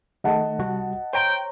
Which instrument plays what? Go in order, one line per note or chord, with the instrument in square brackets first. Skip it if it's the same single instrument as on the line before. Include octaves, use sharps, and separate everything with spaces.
[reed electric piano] D#3 A3 [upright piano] D#5 F#5 A5
[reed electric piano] C2 G3 F#4
[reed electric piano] C5 C#5 A#5 [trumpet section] G5